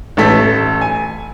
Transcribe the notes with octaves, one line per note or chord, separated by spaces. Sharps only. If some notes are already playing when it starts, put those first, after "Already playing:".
A1 A3 A4 B6
G#5